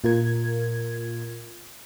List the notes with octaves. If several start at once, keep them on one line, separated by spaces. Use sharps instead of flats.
A#2 F4 A#4 G#6